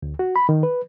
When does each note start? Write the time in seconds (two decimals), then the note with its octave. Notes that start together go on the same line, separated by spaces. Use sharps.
0.03 D2
0.19 F#4
0.36 B5
0.49 D#3
0.63 B4